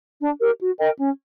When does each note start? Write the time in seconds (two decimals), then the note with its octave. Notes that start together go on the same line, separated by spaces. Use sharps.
0.20 D4
0.40 G4 A#4
0.60 F#4
0.79 A#4 D#5 G5
0.99 C#4